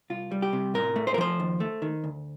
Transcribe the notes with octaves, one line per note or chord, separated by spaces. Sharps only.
C2 F4
G3
G4
C3
A2 A#4
A3
C5
A#4
F3 C5
D#2
A3
D#3
D2